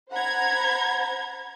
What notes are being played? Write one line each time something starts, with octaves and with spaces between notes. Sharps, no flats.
C5 F#5 A#5 B5 G#6